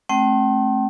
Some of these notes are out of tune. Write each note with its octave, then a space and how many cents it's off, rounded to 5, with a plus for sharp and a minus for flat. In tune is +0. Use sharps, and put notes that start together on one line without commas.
A3 -15 C4 +35 G5 -35